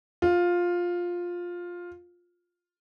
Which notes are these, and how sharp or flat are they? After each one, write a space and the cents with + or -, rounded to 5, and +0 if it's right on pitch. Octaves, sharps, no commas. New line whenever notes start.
F4 +10